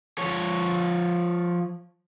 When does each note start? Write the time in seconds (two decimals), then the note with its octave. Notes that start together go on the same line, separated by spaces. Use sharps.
0.18 F3 C#5